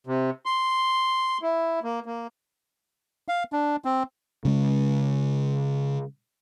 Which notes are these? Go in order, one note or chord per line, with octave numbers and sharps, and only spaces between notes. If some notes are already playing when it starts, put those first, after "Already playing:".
C3
C6
E4
A#3
A#3
F5
D4
C4
C#3 G#3